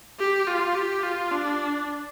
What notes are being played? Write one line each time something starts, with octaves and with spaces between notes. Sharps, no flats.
G4
F4
G4
F4
D4